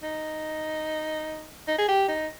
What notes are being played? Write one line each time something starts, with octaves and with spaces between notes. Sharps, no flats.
D#4
D#4
G#4
G4
D#4